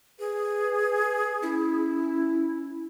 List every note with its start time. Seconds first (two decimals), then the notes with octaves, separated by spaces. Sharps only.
0.19 G#4 B4
1.43 C#4 E4